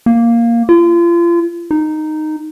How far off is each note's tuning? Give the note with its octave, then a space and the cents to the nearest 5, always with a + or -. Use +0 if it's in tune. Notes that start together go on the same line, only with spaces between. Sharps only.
A#3 +0
F4 -35
D#4 -10